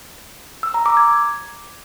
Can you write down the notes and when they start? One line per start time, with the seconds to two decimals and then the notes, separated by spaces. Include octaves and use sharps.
0.63 E6
0.74 A#5
0.86 D6
0.97 G#6